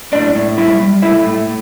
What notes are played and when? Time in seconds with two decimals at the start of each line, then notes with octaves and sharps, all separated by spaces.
0.13 A2 D4 D5
0.35 A2
0.58 G3 E4 E5
0.80 G3
1.02 A3 E4 E5
1.25 A2